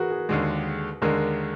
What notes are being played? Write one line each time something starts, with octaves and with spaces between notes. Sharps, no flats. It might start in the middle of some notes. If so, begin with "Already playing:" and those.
Already playing: F#4 G#4 A#4 B4
G#4
D#2 D3 G#3
D#2 D3 G#3 A#4